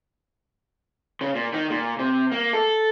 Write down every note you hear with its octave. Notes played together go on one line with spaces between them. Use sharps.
C#3
A#2
D#3
A#2
C3
A#3
A4